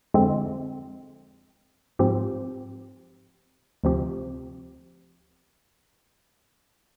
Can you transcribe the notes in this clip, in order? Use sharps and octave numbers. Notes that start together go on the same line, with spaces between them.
F2 D3 G#3 C4
G#2 F3 C4 G4
D2 C3 F3 C4 G4